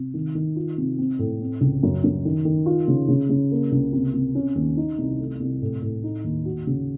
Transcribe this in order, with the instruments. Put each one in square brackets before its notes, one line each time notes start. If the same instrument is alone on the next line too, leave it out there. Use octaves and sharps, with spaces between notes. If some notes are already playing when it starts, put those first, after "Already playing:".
Already playing: [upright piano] C3
D#3
D#3
F4
C3
C4
A2
C4
C#2
F#2
F#2
D#3
D#3
F4
C#3
C#3
C#3
A#3
C#2
C3
C3
C#4
D#2
D#4
C2
A3
C2
A2
A2
D#4
D#2
F#4
C#3